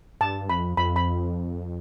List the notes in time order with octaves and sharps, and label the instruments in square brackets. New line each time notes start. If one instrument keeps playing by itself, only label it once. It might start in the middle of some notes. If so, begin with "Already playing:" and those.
[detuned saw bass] G2 [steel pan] A5
[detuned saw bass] F2 [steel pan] B5
[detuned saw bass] F2 [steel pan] B5
[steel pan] B5